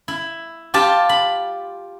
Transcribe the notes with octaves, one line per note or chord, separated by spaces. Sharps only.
E4
F4 G4 A5
B5